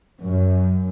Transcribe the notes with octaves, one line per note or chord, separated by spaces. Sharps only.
F#2